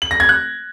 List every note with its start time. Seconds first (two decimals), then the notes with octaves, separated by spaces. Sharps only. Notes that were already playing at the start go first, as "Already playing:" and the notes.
0.02 F#7
0.11 A#6
0.20 G#6
0.29 F#6